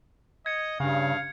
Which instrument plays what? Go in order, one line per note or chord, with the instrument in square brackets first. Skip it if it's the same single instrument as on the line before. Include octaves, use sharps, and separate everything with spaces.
[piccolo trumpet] D#5 [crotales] G#6 C#7
[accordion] G2 [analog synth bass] C#3 [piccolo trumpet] F5